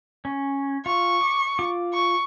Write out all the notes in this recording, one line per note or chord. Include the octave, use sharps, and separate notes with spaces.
C#4
F4 C#6
D6
F4 D6
C#6